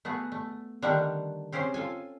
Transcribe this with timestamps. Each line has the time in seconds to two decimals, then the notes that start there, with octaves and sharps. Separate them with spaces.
0.05 A3 B3 F#4 G#4
0.32 A3
0.82 D3 D#3 G3 D4 F#5
1.52 C4 C#4 G4 G#4 C5
1.74 F4 A4 G#5